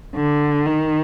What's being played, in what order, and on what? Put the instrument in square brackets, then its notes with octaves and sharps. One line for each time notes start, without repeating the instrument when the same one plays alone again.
[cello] D3
D#3